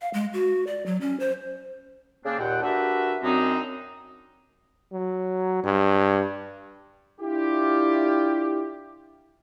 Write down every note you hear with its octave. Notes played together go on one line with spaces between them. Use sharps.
F5
G#3
F#4
D5
F#3
C#4
C5
C#3 A#3 C4 D4
D#2 A#2 F#5 G5
D4 F#4 G4 A#4 B4 E5
F#2 C4 D4 D#4
F#3
G2
D4 E4 F4 G4